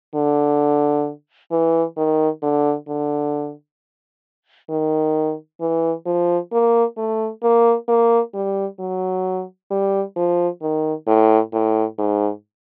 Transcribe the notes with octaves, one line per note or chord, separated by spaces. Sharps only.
D3
E3
D#3
D3
D3
D#3
E3
F3
A#3
A3
A#3
A#3
G3
F#3
G3
F3
D#3
A2
A2
G#2